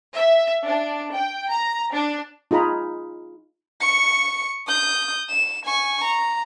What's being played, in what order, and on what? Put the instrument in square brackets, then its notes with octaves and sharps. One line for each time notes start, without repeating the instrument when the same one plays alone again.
[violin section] E5
D4
G5
A#5
D4
[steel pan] D#4 F4 G#4 A#5 B5
[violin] C#6 C#7
D#6 G6
E7
G#5 C#6
A#5